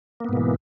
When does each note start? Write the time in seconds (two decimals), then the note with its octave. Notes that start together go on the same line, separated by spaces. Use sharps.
0.20 A#3
0.24 B3
0.29 G#2
0.33 B2
0.37 E3